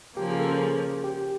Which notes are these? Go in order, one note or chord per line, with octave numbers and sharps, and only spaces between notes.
C#3 F3 A#3 C#4 G4
G#4
A4
G#4
G4